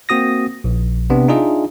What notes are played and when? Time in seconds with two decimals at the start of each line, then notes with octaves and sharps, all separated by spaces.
0.09 A#3 C4 F#4 D#6 A#6
0.64 A#1
1.10 C3 B3 D4
1.28 D4 D#4 F4 G#4 D#5 E5